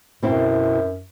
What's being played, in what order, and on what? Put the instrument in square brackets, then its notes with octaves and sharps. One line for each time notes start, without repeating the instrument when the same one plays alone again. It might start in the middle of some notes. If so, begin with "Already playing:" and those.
[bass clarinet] F#2 [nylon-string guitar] B2 C4 E4